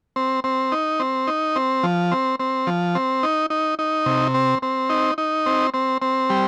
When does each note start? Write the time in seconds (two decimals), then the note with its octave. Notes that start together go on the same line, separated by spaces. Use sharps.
0.16 C4
0.44 C4
0.72 D#4
1.00 C4
1.27 D#4
1.56 C4
1.83 F3
2.12 C4
2.40 C4
2.67 F3
2.95 C4
3.23 D#4
3.50 D#4
3.79 D#4
4.06 C3
4.34 C4
4.62 C4
4.89 D#4
5.18 D#4
5.46 C4
5.74 C4
6.02 C4
6.30 G3